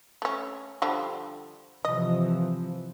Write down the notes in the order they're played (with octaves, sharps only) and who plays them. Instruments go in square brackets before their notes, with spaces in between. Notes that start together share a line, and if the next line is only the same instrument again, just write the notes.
[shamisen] A3 C#4
D3 F3 G3
[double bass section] C3 E3 F3 [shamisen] D#5